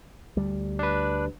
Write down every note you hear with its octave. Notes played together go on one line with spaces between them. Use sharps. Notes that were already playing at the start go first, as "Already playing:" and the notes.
D2 G3
D4 B4